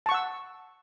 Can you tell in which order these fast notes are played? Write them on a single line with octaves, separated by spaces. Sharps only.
A5 C#6 F#5 E6